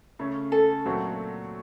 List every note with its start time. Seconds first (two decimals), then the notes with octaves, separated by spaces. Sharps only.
0.19 C#3 A3 C#4
0.52 A4
0.85 A#2 F#3 A3 C4 F#4